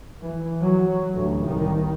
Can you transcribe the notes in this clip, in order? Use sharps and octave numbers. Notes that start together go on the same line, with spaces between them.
E3
F#3
A1 D2
C2 D#3